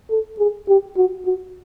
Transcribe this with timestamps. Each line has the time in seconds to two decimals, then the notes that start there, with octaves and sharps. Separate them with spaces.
0.10 A4
0.39 G#4
0.68 G4
0.97 F#4
1.26 F#4